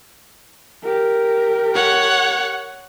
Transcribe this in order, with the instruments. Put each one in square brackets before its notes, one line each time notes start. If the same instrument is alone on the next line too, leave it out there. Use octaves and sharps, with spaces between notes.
[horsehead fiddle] G4 A#4
[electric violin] C#5 F#5